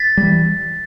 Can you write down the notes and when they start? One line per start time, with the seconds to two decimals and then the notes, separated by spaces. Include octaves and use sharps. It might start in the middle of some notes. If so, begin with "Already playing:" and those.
Already playing: A6 B6
0.17 E3 G3